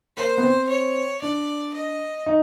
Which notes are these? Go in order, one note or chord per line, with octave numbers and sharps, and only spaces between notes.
A#3 C5
B3
C4
C#5
D4 D5
D#5
D#4